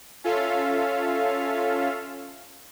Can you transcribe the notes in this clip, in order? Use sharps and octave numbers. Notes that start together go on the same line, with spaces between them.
C#4 F4 A4 E5 F5